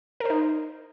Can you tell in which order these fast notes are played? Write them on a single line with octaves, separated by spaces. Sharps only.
A#4 C5 D#4